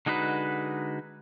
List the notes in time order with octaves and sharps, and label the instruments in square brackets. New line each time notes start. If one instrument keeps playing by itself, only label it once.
[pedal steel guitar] D3 G#3 D#4 F#4 B4